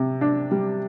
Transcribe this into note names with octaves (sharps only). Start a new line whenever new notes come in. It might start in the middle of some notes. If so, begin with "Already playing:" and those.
Already playing: C3
D4
G3